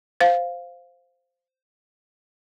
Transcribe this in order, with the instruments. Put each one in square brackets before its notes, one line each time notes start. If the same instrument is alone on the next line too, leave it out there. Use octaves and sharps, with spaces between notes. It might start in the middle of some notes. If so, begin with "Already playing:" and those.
[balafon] C5 F5